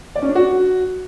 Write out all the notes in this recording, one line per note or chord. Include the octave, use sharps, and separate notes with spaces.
D5
C#4
D4
F#4